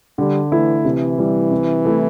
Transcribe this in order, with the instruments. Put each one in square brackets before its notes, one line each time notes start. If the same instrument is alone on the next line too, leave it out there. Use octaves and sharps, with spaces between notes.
[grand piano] D3 [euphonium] G3
[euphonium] E3 [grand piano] A3 E4
[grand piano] C3 [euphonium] E3
[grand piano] G3 E4
C3
A3 E4